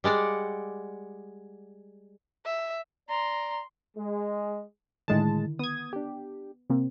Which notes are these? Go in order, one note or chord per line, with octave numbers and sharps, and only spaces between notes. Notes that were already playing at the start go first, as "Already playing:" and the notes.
G3 G#3 D5 F#5
E5
D5 A#5 C6
G#3
A2 D3 D#3 G#3 E4 A5
B3 D#6 G#6
D4 G4
C3 A#3 C4